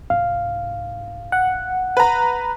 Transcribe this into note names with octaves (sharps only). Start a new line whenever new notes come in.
C2 G#2 F5
F#5
B4 A#5